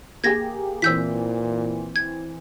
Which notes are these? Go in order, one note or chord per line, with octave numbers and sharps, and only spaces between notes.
A#3 G4 G#4 G#6 A#6
A#2 E3 C4 E6 G6 B6
G#6